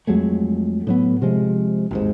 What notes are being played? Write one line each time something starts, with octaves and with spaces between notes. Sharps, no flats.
F2 F#3 G#3 A3
A2 F#3 B3
C3 F3 G#3
G#1 D#2 G#2